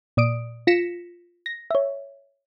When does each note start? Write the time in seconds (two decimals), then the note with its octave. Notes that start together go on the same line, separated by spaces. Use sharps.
0.17 A#2 D5 D#6 D7
0.67 F4 A#6 B6 C#7 E7
1.46 A#6
1.71 C#5 E5